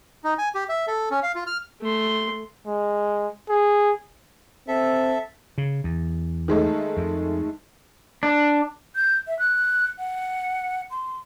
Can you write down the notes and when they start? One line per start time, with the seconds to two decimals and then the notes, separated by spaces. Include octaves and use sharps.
0.24 D#4
0.38 G#5
0.55 G4
0.69 E5
0.87 A4
1.11 C#4
1.23 F5
1.35 F4
1.47 F6
1.81 A3 C6
2.66 G#3
3.49 G#4
4.68 C4 A4 E5
5.58 C#3
5.84 E2
6.48 D#3 G#3 A3
6.97 F2
8.23 D4
8.96 G6
9.27 E5
9.39 F#6
9.99 F#5
10.91 C6